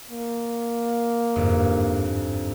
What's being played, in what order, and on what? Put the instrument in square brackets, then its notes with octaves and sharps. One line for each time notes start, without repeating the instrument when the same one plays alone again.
[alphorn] A#3
[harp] G1 F2 G#2